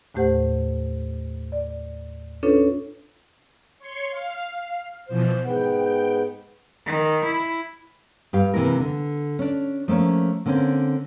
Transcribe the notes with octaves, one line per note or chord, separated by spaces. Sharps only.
D#2 A2 A3 G4 C5 F#5
D5
C#4 D4 F4 A4 B4 C#5
C#5 C6 C#6
F5
B2 E3 F3 C5
G#2 B3 G5
D#3
E4
G2 G4 F5
C3 E3 A#3 E4 A#4
D3
C#4 D4
F3 A3 A#3 C#4
D3 A#3 C4 C#4